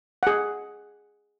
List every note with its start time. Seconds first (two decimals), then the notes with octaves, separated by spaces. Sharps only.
0.23 G#4 F#5